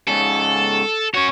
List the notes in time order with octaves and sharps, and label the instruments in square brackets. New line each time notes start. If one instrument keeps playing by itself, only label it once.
[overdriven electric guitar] G#2 C#3 [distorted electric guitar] A4
[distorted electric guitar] C#4 F#4 [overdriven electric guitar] C#5